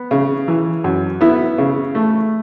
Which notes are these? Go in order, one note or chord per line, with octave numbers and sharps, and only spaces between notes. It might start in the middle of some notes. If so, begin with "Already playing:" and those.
Already playing: B3
C#3
E3
F#2
B3 E4
C#3
A3